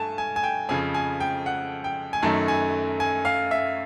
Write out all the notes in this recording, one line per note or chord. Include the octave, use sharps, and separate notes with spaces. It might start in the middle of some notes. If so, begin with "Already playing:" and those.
Already playing: G2 A3 G#5 A5
G#5
G#5
G5
F2 C#3 F3 G#5
G#5
G5
F#5
G5
G#5
F#2 D#3 F#3 A3 A5
G#5
G#5
F5
E5